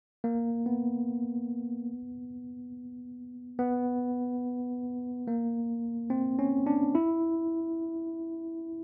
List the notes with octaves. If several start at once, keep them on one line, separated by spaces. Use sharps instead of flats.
A#3
B3
B3
A#3
C4
C#4
D4
E4